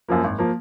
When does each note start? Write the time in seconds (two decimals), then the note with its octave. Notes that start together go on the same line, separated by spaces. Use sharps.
0.09 F#2 F3 A#3
0.24 G#1
0.39 F3 A#3